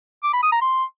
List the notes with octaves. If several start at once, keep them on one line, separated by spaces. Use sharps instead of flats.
D6
B5
D#6
A#5
C6